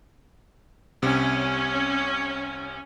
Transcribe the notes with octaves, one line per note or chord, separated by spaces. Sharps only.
C2 C3 C#4